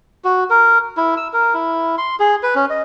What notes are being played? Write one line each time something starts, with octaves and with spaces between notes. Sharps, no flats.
F#4
A#4
E4
E6
A#4
E4
C6
G#4
B4
C#4
D#5